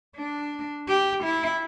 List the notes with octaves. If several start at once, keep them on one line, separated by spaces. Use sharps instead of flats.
D4
G4
E4